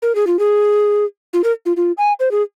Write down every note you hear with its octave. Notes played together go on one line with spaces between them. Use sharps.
A#4
G#4
F4
G#4
F4
A#4
F4
F4
G#5
C5
G#4